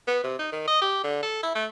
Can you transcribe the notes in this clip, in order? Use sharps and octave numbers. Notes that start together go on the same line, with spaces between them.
B3
C3
D#4
D#3
D#5
G4
D3
A4
E4
A3